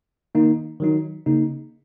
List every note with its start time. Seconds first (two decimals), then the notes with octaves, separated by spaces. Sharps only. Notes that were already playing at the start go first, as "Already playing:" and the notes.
0.35 D#3 A#3 D#4
0.80 D#3 F#3 D#4
1.26 C#3 A#3 D#4